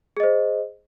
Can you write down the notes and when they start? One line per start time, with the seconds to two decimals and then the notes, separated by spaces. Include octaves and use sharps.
0.17 G#4
0.20 D#5
0.23 C5